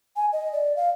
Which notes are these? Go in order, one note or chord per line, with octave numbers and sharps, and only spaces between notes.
G#5
D#5
D5
F5